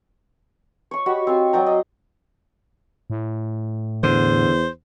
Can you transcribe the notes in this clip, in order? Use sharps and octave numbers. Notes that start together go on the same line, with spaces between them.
C#5 C#6
F#4 G4 D#5 B5
C4 F4 C#5 G#5
F#3 D5 G5 A#5
D#5
A2
E2 D3 C5